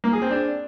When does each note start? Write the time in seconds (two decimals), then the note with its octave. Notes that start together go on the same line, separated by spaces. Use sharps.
0.04 A#3
0.13 G#4
0.22 C4
0.31 D4